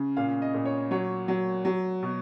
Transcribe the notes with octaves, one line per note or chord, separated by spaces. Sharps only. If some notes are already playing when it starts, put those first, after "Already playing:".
Already playing: C#3
A#2 F5
D#5
A#2
C#5
F#3 C#5
F#3
F#3
B2